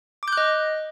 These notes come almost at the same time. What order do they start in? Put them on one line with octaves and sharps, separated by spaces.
D6 G6 F#6 D#5